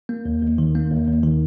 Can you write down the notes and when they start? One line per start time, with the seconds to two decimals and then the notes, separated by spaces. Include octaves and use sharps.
0.09 A#3
0.25 D#2
0.42 D#2
0.58 D#3
0.75 A#3
0.91 D#2
1.08 D#2
1.24 D#3